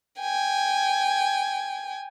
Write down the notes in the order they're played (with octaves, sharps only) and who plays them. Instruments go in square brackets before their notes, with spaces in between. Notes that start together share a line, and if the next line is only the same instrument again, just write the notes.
[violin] G5 G#5